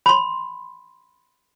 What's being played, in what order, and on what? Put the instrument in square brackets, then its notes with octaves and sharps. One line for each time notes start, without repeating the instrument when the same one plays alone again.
[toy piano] B5 C6